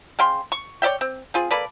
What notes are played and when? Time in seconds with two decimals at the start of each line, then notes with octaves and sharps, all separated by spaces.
0.19 C#3 F5 G5 C6
0.52 C#6
0.82 C#5 D5 E5 G5
1.01 C4
1.34 C4 F4 G#4
1.51 A#3 A4 B4 D5